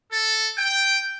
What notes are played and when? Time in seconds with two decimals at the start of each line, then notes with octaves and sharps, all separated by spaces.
0.12 A4
0.58 G5